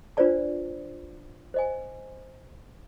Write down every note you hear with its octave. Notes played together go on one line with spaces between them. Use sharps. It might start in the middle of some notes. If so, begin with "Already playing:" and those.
D4 F4 B4 C5 D5 A5
C5 D#5 G#5